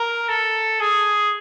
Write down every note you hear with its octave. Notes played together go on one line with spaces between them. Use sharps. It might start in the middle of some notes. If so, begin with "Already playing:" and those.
Already playing: A#4
A4
G#4